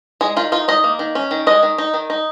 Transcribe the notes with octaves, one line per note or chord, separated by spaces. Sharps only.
G#3 G#4
D#3 F4
D#4 F4
D#3 D#5
A#3
D#3
C#4
D#3
G#3 D#5
D#3
D#4
D#3
D#4